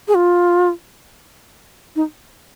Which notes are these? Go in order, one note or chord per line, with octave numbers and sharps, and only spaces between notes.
G#4
F4
D#4